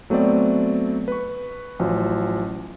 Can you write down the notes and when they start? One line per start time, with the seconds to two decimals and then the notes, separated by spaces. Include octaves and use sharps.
0.10 F#3 A3 B3 C4 D5
1.08 B4 C#6
1.79 A1 F3 F#3